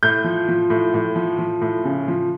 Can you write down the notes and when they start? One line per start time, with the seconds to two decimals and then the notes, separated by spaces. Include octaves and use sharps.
0.03 A2 G6
0.24 F3
0.48 F3
0.70 A2
0.94 A2
1.16 F3
1.38 F3
1.61 A2
1.85 C#3
2.08 F3